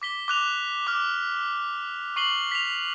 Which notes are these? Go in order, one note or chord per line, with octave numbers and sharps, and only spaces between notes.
D6 B6 G7
D6 F#6 F7
D6 F6
C#6 C7 F#7 G7
B6 F7